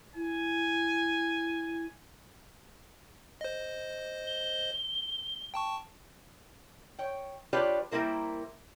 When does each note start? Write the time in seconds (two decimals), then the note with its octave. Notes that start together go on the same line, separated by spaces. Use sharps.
0.15 E4 G#5
3.41 C5 D#5
4.26 G7
5.54 G5 A5 C#6
6.99 C#5 G5
7.53 D4 F4 G4 B4 C#5 D5
7.91 G3 A#3 E4 A#4 C5